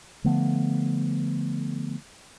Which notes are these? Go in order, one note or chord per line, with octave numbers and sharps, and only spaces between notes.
D3 F3 A3 B3